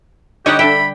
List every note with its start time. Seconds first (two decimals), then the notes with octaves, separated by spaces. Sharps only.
0.46 D3 G3 D#4 G4 C#5 D#5 F#5
0.59 D4 A4 E5 G5 B5